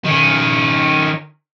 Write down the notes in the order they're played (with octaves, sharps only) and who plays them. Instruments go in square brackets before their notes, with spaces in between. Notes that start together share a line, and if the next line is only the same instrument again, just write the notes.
[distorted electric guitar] D#3 C#4